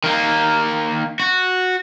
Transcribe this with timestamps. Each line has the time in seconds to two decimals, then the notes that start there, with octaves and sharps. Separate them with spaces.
0.04 D#3 A#3
1.20 F#4